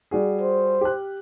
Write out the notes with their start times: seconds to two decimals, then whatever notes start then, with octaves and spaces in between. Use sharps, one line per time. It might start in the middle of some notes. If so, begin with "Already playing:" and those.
0.11 G3 F#4 G#4
0.42 C5
0.81 G4 F#6